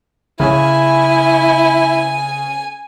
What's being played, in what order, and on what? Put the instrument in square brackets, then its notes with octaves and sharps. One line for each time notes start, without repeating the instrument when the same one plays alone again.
[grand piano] C#3 C#4 [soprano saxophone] E4 [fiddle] G#5